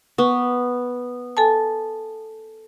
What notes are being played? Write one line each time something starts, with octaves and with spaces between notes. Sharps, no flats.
B3 C#6
A4 G#5 A5